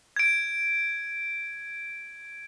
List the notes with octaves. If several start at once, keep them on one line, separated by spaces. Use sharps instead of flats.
G#6 D7